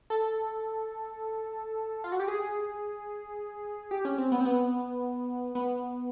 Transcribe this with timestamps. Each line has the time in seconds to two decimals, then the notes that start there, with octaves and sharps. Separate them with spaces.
0.10 A4
2.04 F4
2.12 F#4
2.20 G4
2.28 G#4
3.91 G4
4.05 C#4
4.18 C4
4.32 B3
4.41 C4
4.45 B3
5.55 B3